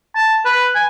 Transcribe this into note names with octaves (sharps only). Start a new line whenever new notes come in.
A5
B4
G#5